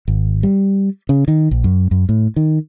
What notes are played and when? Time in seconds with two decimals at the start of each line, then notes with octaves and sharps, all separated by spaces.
0.08 G#1
0.43 G3
1.09 C#3
1.28 D#3
1.51 A#1
1.64 F#2
1.91 F#2
2.09 A2
2.36 D#3